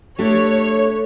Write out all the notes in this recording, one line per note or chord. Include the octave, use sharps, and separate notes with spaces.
A3 D4 G4 C#5